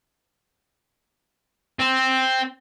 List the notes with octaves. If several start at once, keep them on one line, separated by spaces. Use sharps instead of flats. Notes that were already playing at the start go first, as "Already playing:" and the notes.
C4